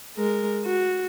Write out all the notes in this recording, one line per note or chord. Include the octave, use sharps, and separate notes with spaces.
G#3 A#4
F#4